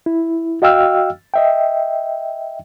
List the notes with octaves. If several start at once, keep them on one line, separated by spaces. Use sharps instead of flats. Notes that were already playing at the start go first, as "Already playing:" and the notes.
E4
F#4 D#5 F5 G5 E6 F6
D#5 E5 G5